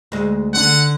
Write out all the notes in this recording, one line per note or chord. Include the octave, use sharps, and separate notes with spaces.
D2 G#3
D3 F#5